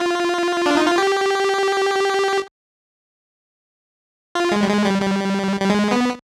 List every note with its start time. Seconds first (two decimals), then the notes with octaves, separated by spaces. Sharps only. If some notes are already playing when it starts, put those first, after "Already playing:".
Already playing: F4
0.66 D4
0.77 D#4
0.87 F4
0.98 G4
4.35 F4
4.51 G#3
4.63 G3
4.69 G#3
4.86 G3
5.02 G3
5.60 G3
5.70 G#3
5.91 B3